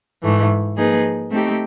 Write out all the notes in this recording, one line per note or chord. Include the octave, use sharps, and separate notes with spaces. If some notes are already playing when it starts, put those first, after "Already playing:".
G#2 E3 A3
F3 A#3 D#4 G#4 B4
A3 C4 D#4 G4